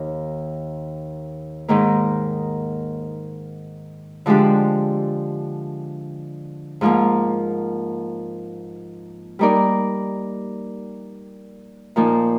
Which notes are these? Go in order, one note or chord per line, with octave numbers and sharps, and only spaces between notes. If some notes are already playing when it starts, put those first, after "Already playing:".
Already playing: D#2 D#3
G#2 D#3 A#3
D3 F3 G#3 D4 G4
G#2 F3 A#3 F4
G3 A#3 D#4 A#4 D5
A#2 F3 A#3 D#4